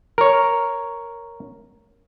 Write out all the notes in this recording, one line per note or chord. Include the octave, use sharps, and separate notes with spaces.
A#4 C#5